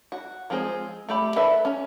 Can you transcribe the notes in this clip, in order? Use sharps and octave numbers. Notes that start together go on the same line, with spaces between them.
F#4
F3 G#3 C4 G#4 C5
A3 G4 B5
D4 A4 B4 E5
C#4